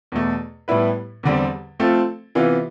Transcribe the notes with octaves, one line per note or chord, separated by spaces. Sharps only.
E2 B2 A3
A2 G3 B3 E4 B4
E2 D3 G3 C4
F3 A3 C4 F4 A4
C3 E3 B3 F4